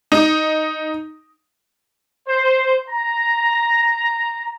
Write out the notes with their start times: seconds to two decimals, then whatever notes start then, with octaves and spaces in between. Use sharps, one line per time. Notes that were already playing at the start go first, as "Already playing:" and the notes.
0.12 D#4
2.28 C5
2.90 A#5